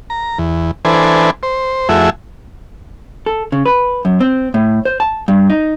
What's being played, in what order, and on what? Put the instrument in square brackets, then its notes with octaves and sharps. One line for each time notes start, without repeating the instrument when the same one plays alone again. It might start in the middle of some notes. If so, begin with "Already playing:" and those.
[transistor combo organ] A#5
E2
E3 D4 A4 B4 C5 G#5
C5
F2 A3 E4 F#4 G#4 E5
[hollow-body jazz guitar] A4
C#3
B4
F#2
C4
A2
C5
A5
G2
D#4